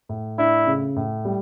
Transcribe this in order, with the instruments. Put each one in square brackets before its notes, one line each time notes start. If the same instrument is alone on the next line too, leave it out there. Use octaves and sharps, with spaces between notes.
[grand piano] A2
[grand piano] D4 [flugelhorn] E4
[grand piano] C#3
A2
G3